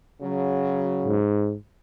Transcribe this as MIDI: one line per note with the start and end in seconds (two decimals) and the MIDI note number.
0.22 1.19 49
0.22 1.19 54
1.06 1.56 44